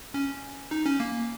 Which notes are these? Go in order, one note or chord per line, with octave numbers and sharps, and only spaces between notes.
C#4
D#4
C#4
A#3